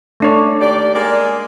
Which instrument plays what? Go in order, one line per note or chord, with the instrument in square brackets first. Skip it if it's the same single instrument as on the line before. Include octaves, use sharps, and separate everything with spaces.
[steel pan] A3 D4 C#5
[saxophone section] D#2 G4 D5
G#3 A#3 D5